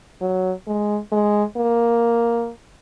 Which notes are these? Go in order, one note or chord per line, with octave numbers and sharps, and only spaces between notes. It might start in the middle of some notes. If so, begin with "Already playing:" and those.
F#3
G#3
G#3
A#3